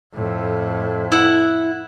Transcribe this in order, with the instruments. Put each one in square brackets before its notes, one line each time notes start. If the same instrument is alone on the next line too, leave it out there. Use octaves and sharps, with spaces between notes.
[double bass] F2 A2
[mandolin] E4 F#5